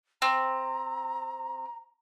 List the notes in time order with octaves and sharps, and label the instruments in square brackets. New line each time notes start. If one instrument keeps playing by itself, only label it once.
[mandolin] C4 [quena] A#5